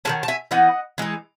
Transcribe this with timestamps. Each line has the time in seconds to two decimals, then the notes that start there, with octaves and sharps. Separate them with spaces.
0.05 D#3 G#3 C#4 F#5 A5
0.23 A5
0.28 E5 G#5
0.51 E3 B3 D#4 D#5 F#5
0.98 E3 G#3 D#4